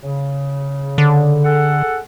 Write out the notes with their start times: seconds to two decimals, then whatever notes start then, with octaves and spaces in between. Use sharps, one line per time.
0.03 C#3
0.98 D3
1.44 G#4 A4 F#5